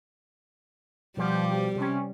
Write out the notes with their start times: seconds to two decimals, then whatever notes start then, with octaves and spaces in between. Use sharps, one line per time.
1.17 B2 F3 G3 G4
1.76 C3 C#4